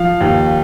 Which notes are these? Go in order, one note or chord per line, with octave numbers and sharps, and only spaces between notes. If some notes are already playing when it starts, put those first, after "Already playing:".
Already playing: F3 F5
D#2